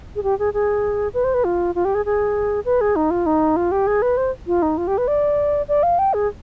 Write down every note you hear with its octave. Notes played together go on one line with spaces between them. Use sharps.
G#4
G4
G#4
G#4
B4
C5
B4
F4
F4
G4
G#4
G#4
B4
G#4
D#4
F4
D#4
F4
G4
G#4
B4
C5
F4
D#4
F4
G4
B4
D5
D5
F5
G5
G#4